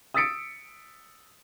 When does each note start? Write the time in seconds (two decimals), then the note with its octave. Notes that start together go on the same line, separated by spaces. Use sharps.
0.14 D#6 E6 A6 B6 C#7 D7